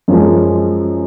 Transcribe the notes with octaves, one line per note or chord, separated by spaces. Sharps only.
F#2 F3 G#3